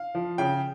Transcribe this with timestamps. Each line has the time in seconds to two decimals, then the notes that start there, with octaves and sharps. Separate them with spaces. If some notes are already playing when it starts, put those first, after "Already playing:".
Already playing: F5
0.15 F3
0.38 C#3 G5